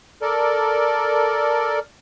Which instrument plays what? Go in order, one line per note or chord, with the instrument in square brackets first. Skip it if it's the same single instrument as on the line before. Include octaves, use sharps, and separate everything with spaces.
[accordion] A4 A#4 D5